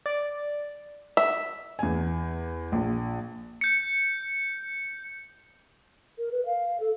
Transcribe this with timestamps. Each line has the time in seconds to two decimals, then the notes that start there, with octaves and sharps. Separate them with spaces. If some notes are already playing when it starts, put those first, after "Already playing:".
0.06 D5
1.17 E5
1.79 E2 G#5
2.72 A#1
3.61 G6 C#7
6.18 A#4
6.32 B4
6.46 F5
6.80 A4